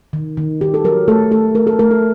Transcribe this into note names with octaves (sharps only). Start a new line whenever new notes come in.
D#3
D#3
D#3 G4
A4
F#3 A#4
A3 A4
A3 A4
A3 A#4
A4
A3 A#4
A4